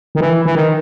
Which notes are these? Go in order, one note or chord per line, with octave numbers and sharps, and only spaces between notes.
D#3
E3
E3
D#3